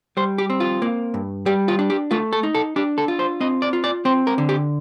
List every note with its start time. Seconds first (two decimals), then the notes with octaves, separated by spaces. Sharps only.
0.17 G3 C5
0.38 G4
0.50 C4
0.60 F4
0.82 A#3
1.14 G2
1.46 G3 G4
1.68 F4
1.79 D4
1.90 G4
2.11 A3 F4
2.33 A4
2.43 D#4
2.55 A4
2.76 D4 G4
2.98 A4
3.08 F4
3.19 C5
3.40 C4 D#5
3.62 D5
3.73 F4
3.84 D5
4.05 C4 C5
4.27 A#4
4.38 D3
4.49 G4